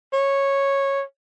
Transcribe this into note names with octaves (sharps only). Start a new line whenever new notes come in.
C#5